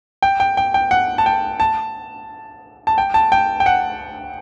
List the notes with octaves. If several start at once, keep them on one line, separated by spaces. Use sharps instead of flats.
G5
G5
G5
G5
F#5
A5
G5
A5
A5
G5
A5
G5
G5
F#5